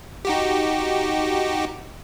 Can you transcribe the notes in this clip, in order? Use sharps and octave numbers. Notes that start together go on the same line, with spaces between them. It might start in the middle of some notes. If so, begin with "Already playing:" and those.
D#4 F#4 G4